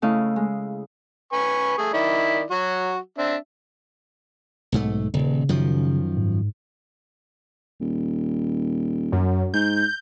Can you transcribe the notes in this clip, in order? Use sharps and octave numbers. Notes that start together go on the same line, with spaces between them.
C#3 A3 E4 D#5 F5
G#3
B4 G#5 C#6
A3 G#4
D#3 E4 D5
F#3 F#4
C4 D4 E5
B1 G#2 A3
D#1 C#3
F#2 D#3 F3
G#2
D#1
F#2
G#2 G6